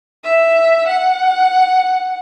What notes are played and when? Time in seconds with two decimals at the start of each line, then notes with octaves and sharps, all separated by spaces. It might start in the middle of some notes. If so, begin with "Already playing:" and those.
0.24 E5
0.87 F#5